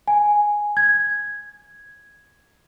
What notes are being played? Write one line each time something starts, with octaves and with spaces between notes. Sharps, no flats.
G#5
G#6